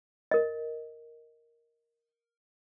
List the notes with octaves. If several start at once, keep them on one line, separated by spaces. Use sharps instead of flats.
A#4 D#5